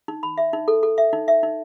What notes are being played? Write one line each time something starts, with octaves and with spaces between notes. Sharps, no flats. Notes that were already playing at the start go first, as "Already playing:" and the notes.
D#4
B5
E5
D#4
A4
A4
E5
D#4
E5
D#4